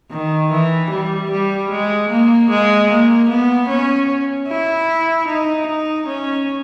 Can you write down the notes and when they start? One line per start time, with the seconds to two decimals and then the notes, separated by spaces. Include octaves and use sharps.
0.11 D#3
0.51 E3
0.90 G3
1.30 G3
1.71 G#3
2.10 A#3
2.50 G#3
2.90 A#3
3.29 B3
3.69 C#4
4.49 E4
5.27 D#4
5.67 D#4
6.07 C#4